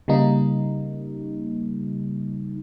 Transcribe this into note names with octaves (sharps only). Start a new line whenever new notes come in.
C#3 G3 A#3 D#4